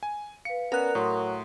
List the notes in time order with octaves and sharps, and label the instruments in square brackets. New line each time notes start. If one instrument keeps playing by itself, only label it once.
[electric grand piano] G#5
[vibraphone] B4 F5 [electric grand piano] C#7
[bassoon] B3 [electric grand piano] C#4 [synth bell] A#4 F#6 [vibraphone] D5 A#5
[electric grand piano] A2 [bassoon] F#3 [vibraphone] C6 D#6